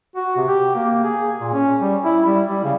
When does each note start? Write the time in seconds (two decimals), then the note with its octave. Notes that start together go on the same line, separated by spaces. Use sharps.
0.16 F#4
0.36 C3
0.48 G4
0.75 A#3
1.04 G#4
1.40 A#2
1.53 C#4
1.80 G3
2.05 E4
2.25 G3
2.48 G3
2.64 C#3